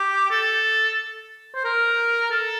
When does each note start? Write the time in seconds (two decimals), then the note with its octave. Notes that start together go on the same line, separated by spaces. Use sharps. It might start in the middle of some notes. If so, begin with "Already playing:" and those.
Already playing: G4
0.30 A4
1.55 C5
1.65 A#4
2.31 A4